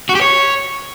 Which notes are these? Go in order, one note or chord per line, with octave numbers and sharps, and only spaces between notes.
F#4
G4
C#5